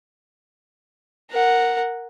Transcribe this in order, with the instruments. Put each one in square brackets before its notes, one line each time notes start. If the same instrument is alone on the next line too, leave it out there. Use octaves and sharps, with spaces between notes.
[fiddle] A#4 F#5